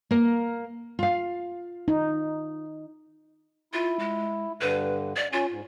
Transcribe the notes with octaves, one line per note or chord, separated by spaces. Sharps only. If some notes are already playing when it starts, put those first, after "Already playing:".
A#3 A#4
F4 F5
D#4
E4 F4
G#3
G2 D3 B4
D5
C#4 F4
G#2